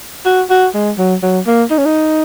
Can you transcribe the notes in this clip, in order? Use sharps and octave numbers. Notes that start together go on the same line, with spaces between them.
F#4
F#4
G#3
F#3
F#3
A#3
D#4
C#4
D#4